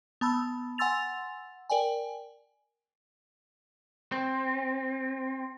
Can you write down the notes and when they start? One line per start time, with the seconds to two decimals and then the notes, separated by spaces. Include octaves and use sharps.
0.21 B3 A5 B5 E6
0.78 F#5 G#5 C6 E6 A6 F7
1.70 A#4 D5 G5 G#5
4.12 C4